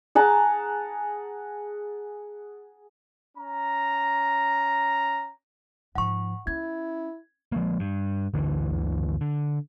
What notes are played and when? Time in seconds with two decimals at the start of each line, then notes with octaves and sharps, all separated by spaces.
0.15 G#4 F#5 A5 A#5
3.37 C#4 A#5
5.95 G#2 F3 F#5 C#6
6.47 C#4 E4 G#6
7.52 F3 G#3 A#3
7.80 G2
8.34 G1 D2 D3 E3
9.21 D3